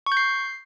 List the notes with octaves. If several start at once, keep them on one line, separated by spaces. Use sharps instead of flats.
C#6
G6
C7